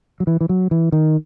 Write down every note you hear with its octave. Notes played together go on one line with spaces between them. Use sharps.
F#3
E3
E3
F#3
E3
D#3